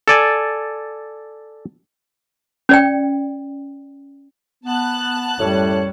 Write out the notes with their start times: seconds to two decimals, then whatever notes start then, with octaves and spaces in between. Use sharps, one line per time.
0.08 A4 D5 G#5
2.69 C#4 D5 G5
4.64 B3 A5 F#6
5.39 F#2 A2 G3 C#5